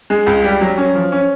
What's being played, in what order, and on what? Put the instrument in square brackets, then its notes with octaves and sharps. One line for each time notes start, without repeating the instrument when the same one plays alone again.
[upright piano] G#3
C#2
G3
F#3
C#4
F3
C#4